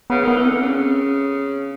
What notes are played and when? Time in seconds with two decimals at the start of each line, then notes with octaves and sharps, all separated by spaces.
0.10 C#3 B3
0.24 D#3 B3
0.37 E3
0.45 D3 C4
0.63 C#3 C#4